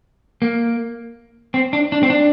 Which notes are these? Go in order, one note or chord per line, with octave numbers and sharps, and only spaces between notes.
A#3
C4
D4
D4
C4
D4